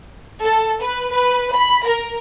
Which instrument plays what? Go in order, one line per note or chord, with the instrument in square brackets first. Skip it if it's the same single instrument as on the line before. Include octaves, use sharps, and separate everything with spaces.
[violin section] A4
B4
B4
B5
A#4